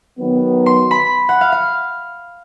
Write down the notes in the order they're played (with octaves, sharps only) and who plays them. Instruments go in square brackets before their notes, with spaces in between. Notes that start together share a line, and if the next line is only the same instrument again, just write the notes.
[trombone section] D#3 F#3 B3
[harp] C6
B5
F#5
F5
F5